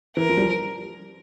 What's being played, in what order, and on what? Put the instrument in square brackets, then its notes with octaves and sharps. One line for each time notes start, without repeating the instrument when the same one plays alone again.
[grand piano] E3 [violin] A#4
[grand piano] F3
G3
F3